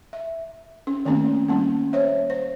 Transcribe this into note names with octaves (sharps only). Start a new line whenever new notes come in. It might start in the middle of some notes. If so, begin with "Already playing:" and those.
E5
C#4
D#3 A3 A#3 C4 C#4
G3 A#3 C#4
C5 C#5 E5
C5